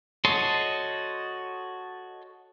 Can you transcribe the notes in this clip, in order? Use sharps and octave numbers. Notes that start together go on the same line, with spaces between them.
F#4 A4 C#5 D#5 C6